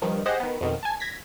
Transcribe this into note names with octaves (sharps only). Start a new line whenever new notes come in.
G2 D#3 F3
G4 G#4 C5 D#5 F#5
D#3 B3
F2 B2 D#3
G#5 A5
G#6 A#6 B6